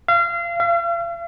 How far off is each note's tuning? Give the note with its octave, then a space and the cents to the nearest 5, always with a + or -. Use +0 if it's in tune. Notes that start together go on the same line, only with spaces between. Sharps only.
F5 -30
F5 -45